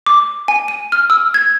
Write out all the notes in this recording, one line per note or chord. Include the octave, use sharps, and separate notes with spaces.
D6
G#5
D#7
F6
E6
G#6